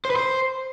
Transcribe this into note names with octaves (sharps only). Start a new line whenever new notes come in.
C5
B4
C5